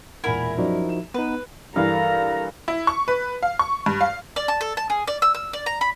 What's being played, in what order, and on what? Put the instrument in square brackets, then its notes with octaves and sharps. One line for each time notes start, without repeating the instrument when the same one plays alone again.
[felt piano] E1 A#2 F#5 [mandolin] E4 A#4 [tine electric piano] G#5 B5 G#6
[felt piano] F#2 D5 [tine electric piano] F3 D#4 F#4
[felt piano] E7
[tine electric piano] B3 D#4 [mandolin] B4
[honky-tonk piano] G2 E3 [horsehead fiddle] A4 A#5 [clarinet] A#4 [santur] F5
[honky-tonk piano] E4
C#6
B4
F5
C#6
G2
F5
[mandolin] D5
A5
A4
A5
G#4
D5
E6
E6
D5
A#5
B5